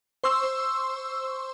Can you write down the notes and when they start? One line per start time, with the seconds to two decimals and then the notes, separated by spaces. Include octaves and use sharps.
0.24 C5 C6 C#6 E6